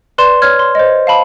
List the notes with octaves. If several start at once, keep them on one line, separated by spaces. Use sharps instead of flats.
B4 D5 C6 E7
C#5 F6 G#6
C6
C5 D#5
F5 A5 B5